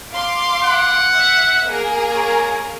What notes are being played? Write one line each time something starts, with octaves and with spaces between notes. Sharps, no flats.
F5 C6 D6
F#5
E5
A#3 G#4 A#4
C#5